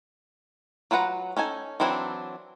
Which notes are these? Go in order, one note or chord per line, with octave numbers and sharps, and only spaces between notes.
F#3 F4 B4 F#5 A#5
C#4 D#4 A4 G#5
E3 F#3 C4 D4 E4